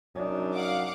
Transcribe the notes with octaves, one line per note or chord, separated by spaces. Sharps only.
F#2 D4 D#4
F5 F#5 D6